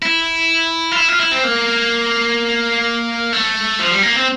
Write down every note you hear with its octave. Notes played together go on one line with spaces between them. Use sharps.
E4
F4
E4
F4
E4
C4
A#3
A3
F3
G3
A#3
C4